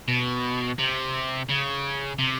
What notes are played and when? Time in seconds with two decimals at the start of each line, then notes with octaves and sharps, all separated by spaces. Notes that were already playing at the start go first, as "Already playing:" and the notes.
0.08 B2
0.79 C3
1.49 C#3
2.19 C3